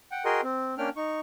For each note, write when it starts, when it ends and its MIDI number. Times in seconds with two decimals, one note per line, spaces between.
0.12 0.25 78
0.12 0.25 79
0.25 0.41 66
0.25 0.41 68
0.25 0.41 70
0.25 0.41 75
0.25 0.41 79
0.25 0.41 84
0.43 0.75 60
0.78 0.89 58
0.78 0.89 61
0.78 0.89 62
0.78 0.89 79
0.78 0.89 89
0.96 1.20 63
0.96 1.20 85